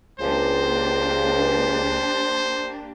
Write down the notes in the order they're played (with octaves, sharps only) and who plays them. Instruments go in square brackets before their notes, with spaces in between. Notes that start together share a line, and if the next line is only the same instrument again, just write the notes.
[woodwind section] C#2 [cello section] A#3 D4 G4 [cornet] C5